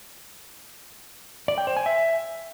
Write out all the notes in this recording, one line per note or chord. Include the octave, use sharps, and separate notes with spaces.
D5
G5
C5
G#5
E5